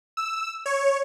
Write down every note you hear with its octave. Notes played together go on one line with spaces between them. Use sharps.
E6
C#5